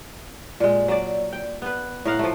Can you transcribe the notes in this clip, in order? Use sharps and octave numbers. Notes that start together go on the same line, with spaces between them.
A#2 G#3
F#3 D5
G5
B3 B4
A2 A#4 F5 F#5
F3 A3